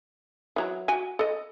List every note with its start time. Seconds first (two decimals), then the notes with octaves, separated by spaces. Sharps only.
0.56 E3 F#3 A#5
0.88 F#4 G#5
1.19 A4 D#5